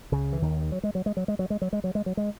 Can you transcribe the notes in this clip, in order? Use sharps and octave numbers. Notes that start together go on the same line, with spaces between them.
C#2 C#3
E3
D#2 D#3
F#3
G#3
F#3
G#3
F#3
G#3
F#3
G#3
F#3
G#3
F#3
G#3
F#3
G#3